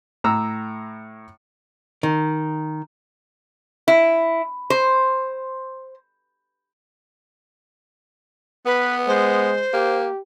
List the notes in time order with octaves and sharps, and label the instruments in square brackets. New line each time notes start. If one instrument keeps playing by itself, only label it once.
[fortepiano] A2 A#5 E6
[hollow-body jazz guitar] D#3
[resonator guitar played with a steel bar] E4
C5
[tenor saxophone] B3 [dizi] B4
[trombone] G#3 [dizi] C5
[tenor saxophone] A#3 [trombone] G4